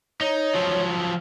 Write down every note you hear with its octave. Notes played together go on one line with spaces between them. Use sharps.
D#4 C#5
F3 F#3